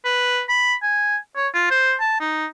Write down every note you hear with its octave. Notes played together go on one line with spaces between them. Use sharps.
B4
B5
G#5
C#5
F4
C5
A5
D#4